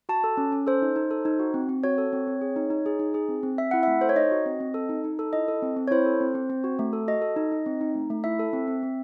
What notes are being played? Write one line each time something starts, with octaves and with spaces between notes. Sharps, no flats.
F#4 A5
A4
C#4
C#4
A4 C5
D#4
D#4
A4
D#4
F#4
C4
C4
F#4 C#5
A4
C4
C4
G#4
D#4
D#4
G#4
D#4
G#4
C4
C4
C4 E5
E4 F#5
A3 E5
A4 C5
C#5
D#4 D#5
F#4
C4
C4
A4
D#4
D#4
A4
E4 D#5
A4
C4
C4
C#5
E4 C5
A4
C4
C4
C4
F#4
A3
A4
F#4 D#5
A4
D#4
D#4
C4
D#4
A3
A3
E4 E5
A4
C4
C4
C4